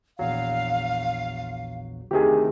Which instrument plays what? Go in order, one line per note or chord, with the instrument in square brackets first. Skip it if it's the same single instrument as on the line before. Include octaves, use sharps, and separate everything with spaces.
[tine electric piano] A#1 E2 F#3 [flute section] F5
[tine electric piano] D2 C3 D#3 [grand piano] G4 G#4